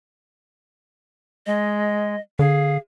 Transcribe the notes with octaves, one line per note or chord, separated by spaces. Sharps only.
G#3 D#5
D3 G#4 F5